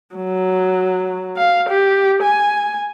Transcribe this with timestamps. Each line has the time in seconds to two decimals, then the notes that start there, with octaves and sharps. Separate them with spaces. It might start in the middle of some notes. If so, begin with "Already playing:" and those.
0.16 F#3
1.37 F5
1.69 G4
2.23 G#5